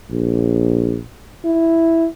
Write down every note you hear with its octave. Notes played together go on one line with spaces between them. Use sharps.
A#1
E4